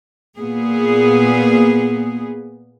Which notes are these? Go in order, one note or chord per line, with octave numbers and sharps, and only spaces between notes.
A#2 B3 G#4